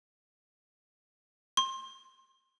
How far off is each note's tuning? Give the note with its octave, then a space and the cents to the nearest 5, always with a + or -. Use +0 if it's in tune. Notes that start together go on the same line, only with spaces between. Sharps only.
C6 +25